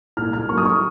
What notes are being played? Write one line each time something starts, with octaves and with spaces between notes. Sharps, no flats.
A#2 F6
F6
F#3 A#3 C#6
D#6
C#6